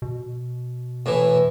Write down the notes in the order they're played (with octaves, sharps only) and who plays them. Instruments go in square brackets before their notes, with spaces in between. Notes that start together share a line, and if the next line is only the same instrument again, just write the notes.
[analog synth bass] B2
[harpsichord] A2 E3